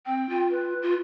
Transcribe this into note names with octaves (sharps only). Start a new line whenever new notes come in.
C4 G5
F4
B4
F4